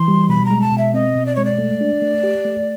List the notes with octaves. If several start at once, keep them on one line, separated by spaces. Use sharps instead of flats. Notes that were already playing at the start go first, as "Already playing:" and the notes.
Already playing: E3 C6
G3
B2 B5
A#5
G#3
A5
B2
E5
C4 D#5
B2
D5
G#3 C#5
D5
A3
D4
A3
G4
A3